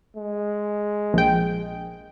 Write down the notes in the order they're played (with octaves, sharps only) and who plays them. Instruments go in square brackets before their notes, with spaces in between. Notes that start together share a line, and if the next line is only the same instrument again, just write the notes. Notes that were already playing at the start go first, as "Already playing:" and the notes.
[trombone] G#3
[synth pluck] A#1 G5